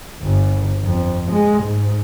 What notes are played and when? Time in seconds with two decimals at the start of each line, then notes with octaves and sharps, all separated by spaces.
0.23 G1
0.85 F2
1.31 G#3
1.63 G#2